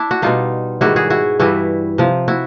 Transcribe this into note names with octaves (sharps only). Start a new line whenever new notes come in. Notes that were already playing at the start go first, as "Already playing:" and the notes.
Already playing: D4 E4
F#4
B2 G3 D#4 F4
G#2 D#3 G3 E4 F#4
F#4 G#4
E4 F#4
G2 E3 G3 E4 F#4
C3 F3
E4 F#4